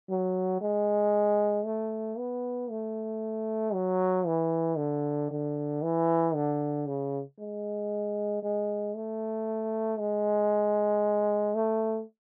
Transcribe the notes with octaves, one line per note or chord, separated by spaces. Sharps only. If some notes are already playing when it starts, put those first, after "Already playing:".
F#3
G#3
A3
B3
A3
F#3
E3
D3
D3
E3
D3
C#3
G#3
G#3
A3
G#3
A3